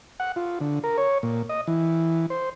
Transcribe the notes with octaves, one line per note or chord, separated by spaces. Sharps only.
F#5
F4
D3
A#4
C#5
A#2
D#5
E3
C5